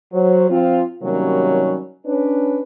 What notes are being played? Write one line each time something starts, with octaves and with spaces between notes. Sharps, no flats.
F#3 C5
F3 C4 F4
C3 D#3 F#3 G3 A#3 C#4
C#4 D4 B4